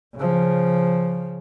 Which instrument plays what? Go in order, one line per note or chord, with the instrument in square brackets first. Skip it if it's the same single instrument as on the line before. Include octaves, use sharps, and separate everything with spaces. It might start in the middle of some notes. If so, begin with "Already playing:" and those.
[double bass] C#3 F3